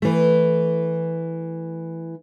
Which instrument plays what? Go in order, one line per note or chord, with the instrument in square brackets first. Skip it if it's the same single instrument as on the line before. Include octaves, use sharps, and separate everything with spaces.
[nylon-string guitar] E3 A3